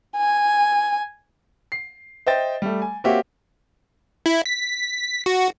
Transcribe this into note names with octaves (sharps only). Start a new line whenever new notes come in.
G#5
C7
C5 D#5 E5 G5 A6
G3 A3
G#5
A#3 C4 F#4 G4 C#5 E5
E4
B6
F#4